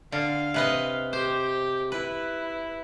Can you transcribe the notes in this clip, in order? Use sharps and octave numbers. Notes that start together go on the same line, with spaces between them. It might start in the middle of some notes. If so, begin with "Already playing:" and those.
D3 F5
C3 B4 D#5
G4 C5
E4 B4